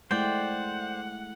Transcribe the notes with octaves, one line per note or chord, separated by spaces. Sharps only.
G#3 A3 E4 C5 D5 F#5 G5